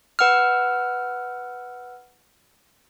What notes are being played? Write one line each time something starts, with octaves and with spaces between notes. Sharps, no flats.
B4 F#5 E6 F6